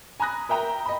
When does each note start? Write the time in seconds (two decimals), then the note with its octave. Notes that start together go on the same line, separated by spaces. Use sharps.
0.20 G#5 A#5 B5 D#6 F#6 A#6
0.49 A#4 E5 G5 A#5
0.86 D#5 B5